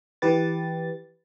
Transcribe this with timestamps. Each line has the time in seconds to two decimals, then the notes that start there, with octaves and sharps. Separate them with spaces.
0.22 E3 G4 B4 A6